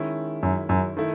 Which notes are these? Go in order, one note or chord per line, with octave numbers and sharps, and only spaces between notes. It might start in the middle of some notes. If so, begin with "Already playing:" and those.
Already playing: D#3 G#3 C#4 E4
F#2
F#2
D#3 A3 E4